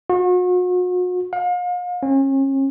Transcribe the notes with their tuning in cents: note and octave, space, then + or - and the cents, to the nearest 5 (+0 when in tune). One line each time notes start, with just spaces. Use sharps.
F#4 -40
F5 +40
C#4 -35